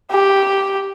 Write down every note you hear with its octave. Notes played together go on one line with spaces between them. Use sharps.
G4